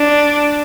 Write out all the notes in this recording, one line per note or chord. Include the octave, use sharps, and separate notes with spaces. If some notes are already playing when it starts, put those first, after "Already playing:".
Already playing: D4